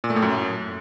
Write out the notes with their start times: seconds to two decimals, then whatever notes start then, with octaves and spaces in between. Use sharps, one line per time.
0.04 A#2
0.10 A3
0.16 A2
0.22 F#2